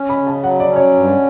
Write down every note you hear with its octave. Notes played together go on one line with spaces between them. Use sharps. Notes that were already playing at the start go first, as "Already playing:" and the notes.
Already playing: C#4
B5
C#3
A5
F#3 F#5
D5
C#4
C#5
G2